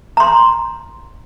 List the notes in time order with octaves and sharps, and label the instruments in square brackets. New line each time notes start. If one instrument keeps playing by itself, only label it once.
[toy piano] A#5 C6